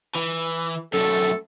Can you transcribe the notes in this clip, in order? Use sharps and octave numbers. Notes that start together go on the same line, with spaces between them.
E3
F#2 A3 A4